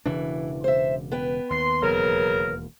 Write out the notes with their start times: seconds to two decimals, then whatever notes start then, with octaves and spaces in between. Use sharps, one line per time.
0.06 E1 C#3 E3 D4
0.64 C5 E5
1.11 B3 B4 G5
1.50 D#2 C6
1.82 E1 D#2 C#3 F#3 A#4